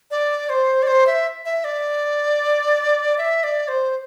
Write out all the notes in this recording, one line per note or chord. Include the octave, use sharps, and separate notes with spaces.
D5
C5
D5
C5
E5
E5
D5
E5
D5
C5